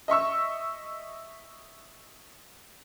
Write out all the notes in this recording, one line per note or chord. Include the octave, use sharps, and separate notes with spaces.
D#5 E5 C#6 E6